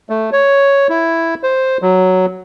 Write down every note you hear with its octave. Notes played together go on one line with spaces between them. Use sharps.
A3
C#5
E4
C5
F#3